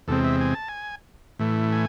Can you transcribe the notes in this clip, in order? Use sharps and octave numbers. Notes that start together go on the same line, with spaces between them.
E2 C3 G#3 C4 A4
E5
G#5
A5
G#5
A2 E3 A3
G#5